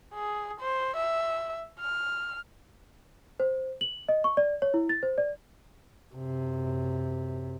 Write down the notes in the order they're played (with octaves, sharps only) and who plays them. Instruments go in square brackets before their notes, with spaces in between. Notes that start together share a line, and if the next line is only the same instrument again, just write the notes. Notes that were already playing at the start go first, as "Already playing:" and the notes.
[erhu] G#4
C5
E5
F6
[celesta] C5
F#7
D#5
C#6
D5
C#5
E4
A6
C5
D5
[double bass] F#2 C3